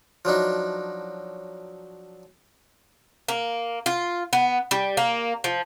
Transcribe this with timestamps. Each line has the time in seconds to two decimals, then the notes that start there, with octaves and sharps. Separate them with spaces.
0.25 F3 F#3 D4 D#4
3.28 A#3
3.86 F4
4.33 B3
4.71 G3
4.97 A#3
5.44 F3